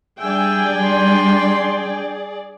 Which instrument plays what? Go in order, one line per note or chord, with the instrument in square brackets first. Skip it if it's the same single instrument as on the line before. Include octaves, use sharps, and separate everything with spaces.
[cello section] G3 D4 [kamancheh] G#4 D5 [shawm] E5 [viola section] G5 G#5
[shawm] C6